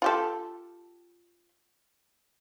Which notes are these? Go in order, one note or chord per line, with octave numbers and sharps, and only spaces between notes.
F4 G4 A4